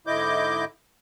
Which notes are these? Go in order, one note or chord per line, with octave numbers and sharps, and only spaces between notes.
G#2 D3 E4 D#5 D6 G6